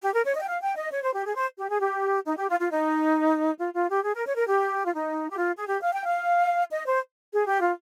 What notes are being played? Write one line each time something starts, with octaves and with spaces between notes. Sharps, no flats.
G4
A#4
C#5
D#5
G5
F5
G5
D#5
C#5
C5
G4
G#4
C5
G4
G#4
G4
D#4
G4
F4
F4
D#4
F4
F4
G4
G#4
A#4
C#5
A#4
G4
F4
D#4
G4
F4
G#4
G4
F5
G5
F5
D#5
C5
G#4
G4
F4